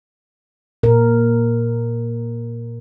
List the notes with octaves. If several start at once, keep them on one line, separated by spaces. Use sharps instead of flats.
A#2 A#4